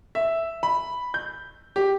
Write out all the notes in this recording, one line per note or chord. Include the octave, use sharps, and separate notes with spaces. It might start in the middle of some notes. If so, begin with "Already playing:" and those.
E5
B5
G6
G4